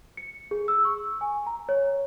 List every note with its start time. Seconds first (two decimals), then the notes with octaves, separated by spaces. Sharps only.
0.17 C#7
0.51 G#4
0.68 E6
0.85 C#6
1.21 G#5
1.46 A#5
1.69 C#5